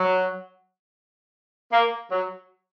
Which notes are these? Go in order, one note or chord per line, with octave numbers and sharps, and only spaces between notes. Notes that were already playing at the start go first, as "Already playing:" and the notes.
Already playing: F#3
A#3
F#3